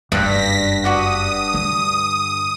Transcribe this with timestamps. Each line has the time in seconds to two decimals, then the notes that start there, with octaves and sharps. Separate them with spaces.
0.12 F#1 G2 A#6 B6
0.84 F#4 D5 F#5 D#6
1.54 D3